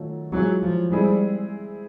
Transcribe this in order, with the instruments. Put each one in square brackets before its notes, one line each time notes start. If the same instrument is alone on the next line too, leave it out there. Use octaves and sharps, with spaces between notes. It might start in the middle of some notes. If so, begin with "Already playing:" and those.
Already playing: [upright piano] D#3 F#3 A3 C#4 F4
[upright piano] E3 G#3 C#4 F4 G#4 [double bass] F#3
[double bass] F3
[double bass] G3 [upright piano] G#3 C4 E4 G#4